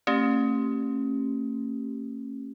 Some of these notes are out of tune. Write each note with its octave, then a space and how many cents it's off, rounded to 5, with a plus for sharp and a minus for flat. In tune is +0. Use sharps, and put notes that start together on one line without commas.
A3 +45 C#4 -30 G4 +0